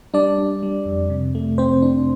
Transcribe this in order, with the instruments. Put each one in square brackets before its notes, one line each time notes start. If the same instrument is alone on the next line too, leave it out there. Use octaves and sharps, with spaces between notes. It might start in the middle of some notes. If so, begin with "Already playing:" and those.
[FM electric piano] G3 D4 D5
D4
G3
F2
C3
A3
C3 C4 C5
D4